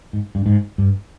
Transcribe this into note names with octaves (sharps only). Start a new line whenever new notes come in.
G#2
G2
G#2
G2